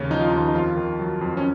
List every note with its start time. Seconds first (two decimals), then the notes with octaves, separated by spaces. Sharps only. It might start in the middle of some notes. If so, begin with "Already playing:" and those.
Already playing: D#2 C#3 C#4
0.10 F3 D#4
0.21 F4
0.29 D#4
0.33 D#2
0.48 D#4
0.55 F2 F4
0.76 D#3
0.99 F#3
1.21 F2
1.37 C#4